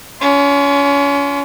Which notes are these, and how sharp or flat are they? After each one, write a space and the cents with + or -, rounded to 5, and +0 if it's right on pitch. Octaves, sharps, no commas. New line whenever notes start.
C#4 +30 F4 +0